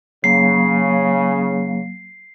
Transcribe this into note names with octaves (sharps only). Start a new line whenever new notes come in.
C#3 F#3 A#3 F5 C7